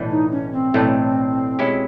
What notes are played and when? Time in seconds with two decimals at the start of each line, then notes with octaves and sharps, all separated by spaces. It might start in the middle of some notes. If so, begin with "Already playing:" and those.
Already playing: B1 A2 E3 A3 D4
0.10 D#4
0.31 C#4
0.52 C4
0.74 B1 A2 E3 A3 D4
1.59 B2 G#3 C#4 E4 G4